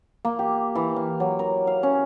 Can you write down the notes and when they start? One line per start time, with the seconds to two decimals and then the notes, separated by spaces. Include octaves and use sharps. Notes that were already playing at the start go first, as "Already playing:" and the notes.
0.25 A#3
0.39 G4
0.75 E3
0.96 F5
1.20 F#3
1.39 A#4
1.67 F5
1.83 C#4